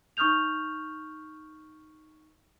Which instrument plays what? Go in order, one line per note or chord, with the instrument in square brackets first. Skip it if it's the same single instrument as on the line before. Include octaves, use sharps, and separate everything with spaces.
[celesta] D#4 C#6 D#6 F6 G6 F7